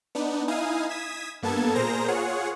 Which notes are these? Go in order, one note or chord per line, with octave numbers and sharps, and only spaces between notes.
B3 D4 D#4
D#4 E4 F5 G#5 D#6
D#6 G#6 B6 E7
G2 A#3 B3 A4 A5 G#6
A#2 G#4 A#4 C5 A#5 A#6
F4 G#4 C#5 F#5